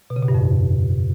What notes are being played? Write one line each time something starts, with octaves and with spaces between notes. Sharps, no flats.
B2
C#3
B2
G2
F2